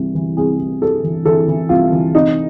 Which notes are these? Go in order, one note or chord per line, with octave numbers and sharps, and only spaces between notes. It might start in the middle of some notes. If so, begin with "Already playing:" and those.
Already playing: C2 C3 E3 G3
E3
C2 G#4
C3
G3 A4
E3
E3 A4
E3
C2 F4
E3
C3 D#4